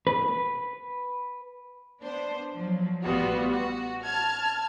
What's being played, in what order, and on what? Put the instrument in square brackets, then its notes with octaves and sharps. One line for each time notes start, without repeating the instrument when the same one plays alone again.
[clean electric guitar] B4
[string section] B3 D4 C5
F3 F#3
A1 G3 B3 F4 F#4
F#4
A5 F6 G#6